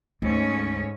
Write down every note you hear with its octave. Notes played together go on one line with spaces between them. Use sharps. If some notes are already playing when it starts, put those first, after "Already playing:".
D2 G#2 A3 C#4